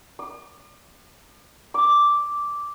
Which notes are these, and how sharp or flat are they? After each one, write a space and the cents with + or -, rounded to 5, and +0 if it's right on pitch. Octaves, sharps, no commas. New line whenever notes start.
D6 +45
D6 -5